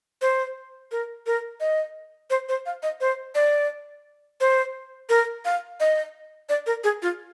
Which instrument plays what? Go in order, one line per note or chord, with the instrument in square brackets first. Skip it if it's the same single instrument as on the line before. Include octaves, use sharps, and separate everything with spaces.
[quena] C5
A#4
A#4
D#5
C5
C5
F5
D#5
C5
D5
C5
A#4
F5
D#5
D5
A#4
G#4
F4